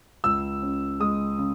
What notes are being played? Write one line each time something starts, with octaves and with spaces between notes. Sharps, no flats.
C#2 E6
C#4
G#3 D#6
C#3